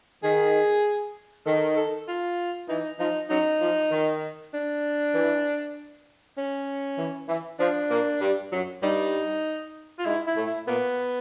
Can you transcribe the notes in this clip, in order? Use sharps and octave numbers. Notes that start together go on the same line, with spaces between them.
D#3 G#4
D#3 A4
A4
F4
E3 D#4
F3 D#4
F#2 F#3 D#4
F3
D#3
D4
E3
C#4
E3
E3
F3 D4
A#2 A#3
G2 G3
F#2 F#3
G2 G3 D#4
F4
G#2 G#3 E4
E4
A2 A3
E4
A#2 A#3 B3